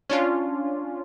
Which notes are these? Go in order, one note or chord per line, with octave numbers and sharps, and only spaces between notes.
C#4 D4 F4